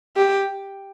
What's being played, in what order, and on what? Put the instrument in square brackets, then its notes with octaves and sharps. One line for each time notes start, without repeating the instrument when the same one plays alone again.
[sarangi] G4